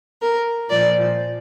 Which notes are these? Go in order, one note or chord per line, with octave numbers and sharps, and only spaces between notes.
A#4
A#2 F3 D5